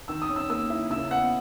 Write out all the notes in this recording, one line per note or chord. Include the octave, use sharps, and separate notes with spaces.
D#3 E6
D#6
C#4
E6
A#3 E6
E4
C#3 E6
B3 F#5